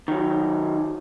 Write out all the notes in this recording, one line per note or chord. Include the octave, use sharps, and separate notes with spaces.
D#3 F#3